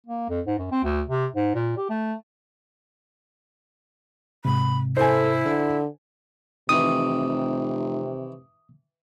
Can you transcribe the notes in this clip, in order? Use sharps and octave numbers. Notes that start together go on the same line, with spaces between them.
A#3
F2
G#2
F#2
C4
D2
C3
G#2
A#2
G4
A3
G#2 C3 B5
E4 A4 C5 G#5
D3
F1 C3 D#3 E3 D#6